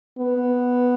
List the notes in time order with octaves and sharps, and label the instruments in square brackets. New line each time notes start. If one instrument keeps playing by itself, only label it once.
[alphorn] B3